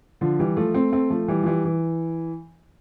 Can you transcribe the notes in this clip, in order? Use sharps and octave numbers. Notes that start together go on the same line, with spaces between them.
D3 F3
E3 G3
F3 A3
A3 C4
A3 C4
F3 A3
E3 G3
F3
E3 G3
E3